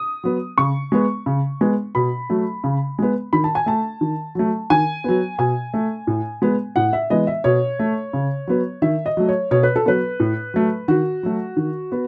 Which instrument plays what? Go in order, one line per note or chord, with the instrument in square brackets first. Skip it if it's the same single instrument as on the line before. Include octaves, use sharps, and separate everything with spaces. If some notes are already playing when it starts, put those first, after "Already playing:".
Already playing: [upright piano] D#6
F#3 B3
C#3 C#6
G#3 B3
C#3
G#3 B3
B2 B5
F#3 A3
C#3
G#3 B3
D#3 B5
A5
G#5
A3 A5
D#3
F#3 A3
D#3 G#5
F#3 B3
B2 G#5
A3
A2
G#3 B3
A2 F#5
E5
E3 G#3 B3 D#5
E5
B2 C#5
A3
C#3
F#3 B3
D#3 E5
D#5
F#3 A3
C#5
B2 C#5
B4
A4
F#3 B3 B4
A2
F#3 A3
D#3 F#4
F#3 A3
D#3
B3